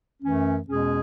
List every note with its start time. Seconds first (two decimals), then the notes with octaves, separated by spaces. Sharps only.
0.23 F#2 E3 A3 C#4
0.67 E2 B2 G#3 C#4 G#4